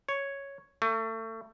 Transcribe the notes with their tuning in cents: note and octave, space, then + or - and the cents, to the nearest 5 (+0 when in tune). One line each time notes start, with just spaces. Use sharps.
C#5 +0
A3 +30